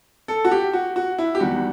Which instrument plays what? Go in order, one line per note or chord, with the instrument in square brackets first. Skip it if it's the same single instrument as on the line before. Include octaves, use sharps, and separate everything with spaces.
[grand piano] A4
F#4
G4
F#4
F#4
E4
G4
E2 D#3 G3 F#4